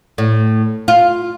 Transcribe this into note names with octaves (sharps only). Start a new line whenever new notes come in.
A2
F4